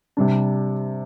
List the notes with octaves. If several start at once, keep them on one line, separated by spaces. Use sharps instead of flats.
C3 G3 D4